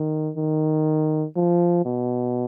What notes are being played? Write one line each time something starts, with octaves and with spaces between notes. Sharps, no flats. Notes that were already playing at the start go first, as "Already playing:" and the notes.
Already playing: D#3
D#3
F3
B2